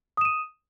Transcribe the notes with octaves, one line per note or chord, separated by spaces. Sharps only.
D#6 D#7 E7